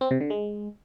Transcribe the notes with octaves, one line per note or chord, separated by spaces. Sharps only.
C4
C3
D3
G#3